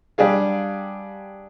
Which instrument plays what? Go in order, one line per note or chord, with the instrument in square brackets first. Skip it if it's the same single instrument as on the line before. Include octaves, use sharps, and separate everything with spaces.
[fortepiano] G3 D4 G4 G#4 F5